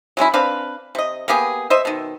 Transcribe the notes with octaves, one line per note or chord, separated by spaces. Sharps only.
F#3 G#3 C#4 E4
C4 D4 B4 F5
C3 D#5
A#3 B3 G4 G#4
C5 D#5 E5
B2 D#3